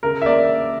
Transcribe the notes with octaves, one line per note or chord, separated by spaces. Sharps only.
C#3 A#4
E5
A#3 D5